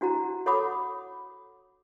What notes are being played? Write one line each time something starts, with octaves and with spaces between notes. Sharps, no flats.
D4 E4 F#4 C5 F#5 A#5
A4 C#5 F#5 B5 D6 D#6